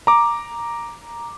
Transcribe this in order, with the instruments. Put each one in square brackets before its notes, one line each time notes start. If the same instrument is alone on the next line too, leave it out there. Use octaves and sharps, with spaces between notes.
[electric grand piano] A#5 D6